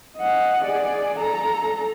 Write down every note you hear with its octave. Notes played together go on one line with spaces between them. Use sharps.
D#5 F#5
G#4 D5
A4 A#5